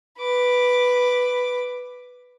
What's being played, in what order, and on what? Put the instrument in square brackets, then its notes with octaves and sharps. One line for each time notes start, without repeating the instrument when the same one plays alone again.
[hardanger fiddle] B4 D6